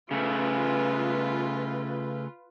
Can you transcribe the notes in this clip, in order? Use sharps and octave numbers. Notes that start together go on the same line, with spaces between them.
C#3 A3 F4 B4